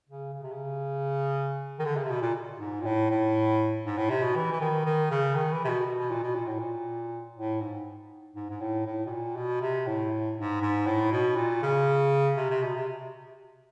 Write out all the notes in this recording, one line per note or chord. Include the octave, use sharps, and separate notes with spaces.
C#3
C#3
C3
C#3
D#3
D3
C#3
C3
B2
A#2
G#2
A#2
A2
A2
G#2
A2
C3
B2
E3
E3
D#3
D#3
C#3
D#3
E3
C3
B2
B2
B2
A#2
B2
A#2
A2
A#2
A2
G#2
G#2
G#2
A2
A2
B2
A#2
B2
C3
A2
G#2
G#2
A2
B2
A#2
C#3
C3
C3
B2
C3